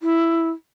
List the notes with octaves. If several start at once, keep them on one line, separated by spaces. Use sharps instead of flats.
E4